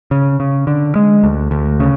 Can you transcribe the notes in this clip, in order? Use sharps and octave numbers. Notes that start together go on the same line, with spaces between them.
C#3
C#3
D3
G#3
D2
D2
C#3